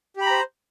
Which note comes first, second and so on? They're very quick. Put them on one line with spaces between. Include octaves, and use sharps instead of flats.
G4 B5 A#5 C5